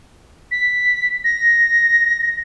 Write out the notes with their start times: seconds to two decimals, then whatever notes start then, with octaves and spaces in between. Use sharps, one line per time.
0.51 B6
1.24 A#6